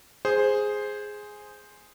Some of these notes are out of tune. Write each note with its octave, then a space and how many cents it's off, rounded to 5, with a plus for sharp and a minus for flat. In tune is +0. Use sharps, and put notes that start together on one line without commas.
G#4 +0 C5 +0